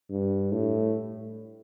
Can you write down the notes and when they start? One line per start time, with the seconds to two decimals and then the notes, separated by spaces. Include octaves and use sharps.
0.11 G2
0.52 A2